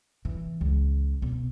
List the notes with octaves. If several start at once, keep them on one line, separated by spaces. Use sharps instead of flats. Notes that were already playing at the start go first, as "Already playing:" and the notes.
E3
C#2
B1